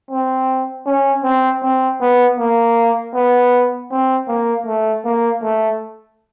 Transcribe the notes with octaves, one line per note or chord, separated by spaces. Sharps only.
C4
C#4
C4
C4
B3
A#3
B3
C4
A#3
A3
A#3
A3